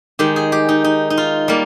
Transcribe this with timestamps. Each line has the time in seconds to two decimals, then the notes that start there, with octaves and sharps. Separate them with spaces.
0.19 D#3 G#3 G4
0.36 G#4
0.52 G4
0.69 D#4
0.84 D#4
1.10 D#4
1.17 F4
1.48 G3 A#3